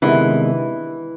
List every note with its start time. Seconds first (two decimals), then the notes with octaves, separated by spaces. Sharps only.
0.02 C3 D#3 E3 G#3 B3 D4